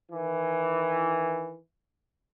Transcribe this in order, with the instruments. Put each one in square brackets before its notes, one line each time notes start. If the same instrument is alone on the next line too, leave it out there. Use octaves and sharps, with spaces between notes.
[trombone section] D#3 E3